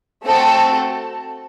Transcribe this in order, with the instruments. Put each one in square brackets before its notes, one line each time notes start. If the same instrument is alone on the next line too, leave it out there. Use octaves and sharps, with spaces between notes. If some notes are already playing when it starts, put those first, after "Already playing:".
[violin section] A3 C4 F#4 A4